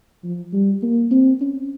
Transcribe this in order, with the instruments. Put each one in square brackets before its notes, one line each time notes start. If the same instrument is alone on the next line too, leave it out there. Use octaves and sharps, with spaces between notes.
[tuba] F3
G3
A#3
C4
C#4